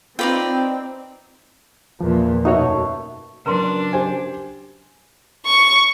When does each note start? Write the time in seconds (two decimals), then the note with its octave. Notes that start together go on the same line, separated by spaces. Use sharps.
0.19 C4 D#4 F4 B4 D5 G5
2.00 E2 A#2 F3
2.45 F#2 B2 A3 D#4 F#4 C#5
3.46 C#3 F#3 D4 A#4 B4 A#5 C6
3.93 G4 C5 G#5
5.45 C#6